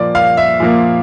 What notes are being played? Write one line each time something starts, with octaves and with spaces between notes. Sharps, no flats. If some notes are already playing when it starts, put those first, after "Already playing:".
Already playing: A#2 F3 A#3 D5
F5
E5
A#2 F3 A#3